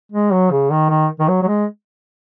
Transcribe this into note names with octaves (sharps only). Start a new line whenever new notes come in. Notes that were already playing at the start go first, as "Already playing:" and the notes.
G#3
F#3
C#3
D#3
D#3
D#3
F#3
F#3
G#3